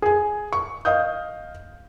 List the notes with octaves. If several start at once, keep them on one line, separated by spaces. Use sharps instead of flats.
G#4 G#5
C#6
D#5 F5 D#6 G6